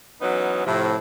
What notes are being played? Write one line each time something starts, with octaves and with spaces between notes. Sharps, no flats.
E3 F#3 B3 C#4 D#4 B4
A2 C3 F3